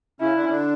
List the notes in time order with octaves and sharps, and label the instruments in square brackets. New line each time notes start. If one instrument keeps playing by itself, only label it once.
[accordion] C#3 C#4 [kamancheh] E4
[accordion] D3 D4
C#4
D3 D4